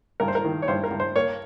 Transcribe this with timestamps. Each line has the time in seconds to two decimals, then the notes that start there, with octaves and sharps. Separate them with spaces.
0.20 G2 A#4
0.28 C5
0.35 A#4
0.45 D#3
0.62 C#5
0.68 G2 C5
0.84 A#4
0.91 G2
1.00 C5
1.16 A#3 C#5